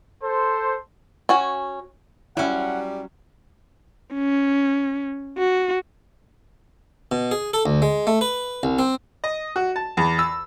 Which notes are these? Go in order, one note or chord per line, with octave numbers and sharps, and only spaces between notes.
A4 C5
C#4 F#4 G#5
F#3 G3 C#4 E4 F#5
C#4
F#4
B2
G#4
A4
D2
G#3
A3
B4
C2
C4
D#5
F#4
A5
E2
E6